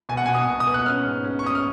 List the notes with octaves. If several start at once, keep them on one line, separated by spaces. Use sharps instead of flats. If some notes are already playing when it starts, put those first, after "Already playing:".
B2 G#5
F#5
B2 G#5
D#6
B2
D#6
B3
F#6
C#4 F6
G#2
C#4
C#6
C#4 D#6
F6